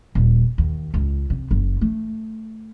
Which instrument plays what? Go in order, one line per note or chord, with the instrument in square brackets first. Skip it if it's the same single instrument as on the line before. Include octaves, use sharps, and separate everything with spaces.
[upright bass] D#1
D#2
C#2
C3
F#1
A3